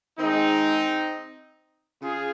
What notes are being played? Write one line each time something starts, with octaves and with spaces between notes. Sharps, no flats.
D#3 G#3 C4 D#4
C#3 F4 G#4